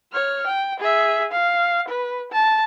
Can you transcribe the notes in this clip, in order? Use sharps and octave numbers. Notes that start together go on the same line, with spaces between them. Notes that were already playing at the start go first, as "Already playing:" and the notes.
C#5 F6
G5
G#4 E5
F5
B4
A5